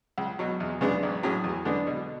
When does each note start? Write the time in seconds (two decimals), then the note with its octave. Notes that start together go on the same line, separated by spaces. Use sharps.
0.18 C#2
0.39 B2 F#3
0.60 E2
0.81 C#3 G#3 B3 D4
1.03 A1
1.23 A2 F#3 C#4 G#4
1.44 E2
1.65 D3 G#3 B3 D4
1.87 B2